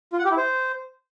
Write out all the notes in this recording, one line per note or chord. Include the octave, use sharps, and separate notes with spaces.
F4
F#5
G4
E4
C5